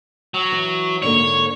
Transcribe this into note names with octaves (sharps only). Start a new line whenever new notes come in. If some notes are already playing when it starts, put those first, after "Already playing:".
F#3
E3
G#2 D3 A#3 C#5